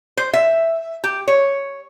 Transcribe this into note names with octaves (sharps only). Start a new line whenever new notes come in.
C5
E5
G4
C#5